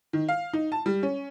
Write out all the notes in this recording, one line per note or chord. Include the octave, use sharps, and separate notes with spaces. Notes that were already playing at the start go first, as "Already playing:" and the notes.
D#3
F5
D#4
A5
G3
C#4